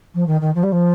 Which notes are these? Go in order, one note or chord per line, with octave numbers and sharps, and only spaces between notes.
F3
D#3
D#3
F3
G3
F3